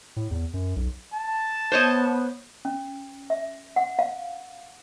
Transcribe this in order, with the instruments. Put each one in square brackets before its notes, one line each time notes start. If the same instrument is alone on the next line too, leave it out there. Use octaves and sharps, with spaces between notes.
[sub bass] A2
E2
F#2
B1
[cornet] A5
[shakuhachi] B3 [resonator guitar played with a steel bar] C5 C#5 D#5
[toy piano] C#4
E5
F#5
F5